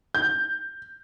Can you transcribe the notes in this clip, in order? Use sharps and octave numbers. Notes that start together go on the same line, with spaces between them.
G6